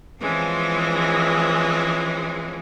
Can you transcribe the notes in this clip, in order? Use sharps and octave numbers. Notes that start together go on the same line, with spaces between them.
E3 F3 G#3 C4 C#4